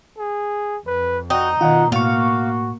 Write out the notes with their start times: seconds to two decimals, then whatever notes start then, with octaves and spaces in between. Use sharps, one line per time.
0.18 G#4
0.86 F2 B4
1.30 D#4 F#4 G5
1.61 B2 D#3 F4 D#5 F#5
1.92 A2 A#3 F#4 F5 C#6